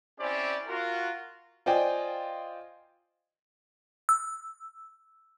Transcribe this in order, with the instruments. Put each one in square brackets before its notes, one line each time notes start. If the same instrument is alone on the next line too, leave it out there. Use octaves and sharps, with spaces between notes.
[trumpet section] C4 C#4 E4 G4 C5 D5
F4 F#4 A#4
[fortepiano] F4 C5 D5 D#5 G5 G#5
[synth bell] E6